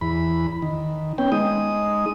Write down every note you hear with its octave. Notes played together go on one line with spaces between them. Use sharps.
E2 B5
D#3
B3 C#4 G5
G#3 D#4 D#6